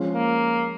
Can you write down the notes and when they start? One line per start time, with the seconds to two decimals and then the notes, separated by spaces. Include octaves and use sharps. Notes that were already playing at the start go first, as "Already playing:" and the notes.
Already playing: F3 G#3 C#4 F4
0.14 A#3